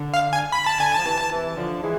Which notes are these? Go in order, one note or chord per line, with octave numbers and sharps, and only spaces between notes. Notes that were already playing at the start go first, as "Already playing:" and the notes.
Already playing: D3
F5
G#5
B5
A5
D3 G#5
F3 A5
C3 E3
C3 E3
D3 F3
E3 G#3